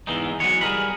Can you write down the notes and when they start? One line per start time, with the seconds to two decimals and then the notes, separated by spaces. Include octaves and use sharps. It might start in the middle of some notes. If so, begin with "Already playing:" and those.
0.07 E2 G#2 E3 D#4
0.40 E2 B2 F#3 G#3 B3 C#5
0.61 G3 G#4 A#4 B5